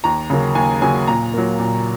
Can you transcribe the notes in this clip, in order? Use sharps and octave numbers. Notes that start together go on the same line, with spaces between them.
D#2 A#5
C#3 F#3 A#3
D#2 G#5
C#3 F#3 A#3 G#5
A#2 A#5
F#3 A#3
A#2